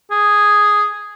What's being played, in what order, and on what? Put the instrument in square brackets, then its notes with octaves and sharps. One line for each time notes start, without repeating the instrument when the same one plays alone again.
[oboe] G#4